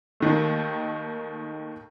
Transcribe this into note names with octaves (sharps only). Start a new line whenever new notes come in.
D#2 D#3 A3